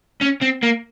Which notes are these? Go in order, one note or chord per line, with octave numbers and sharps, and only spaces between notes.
C#4
C4
A#3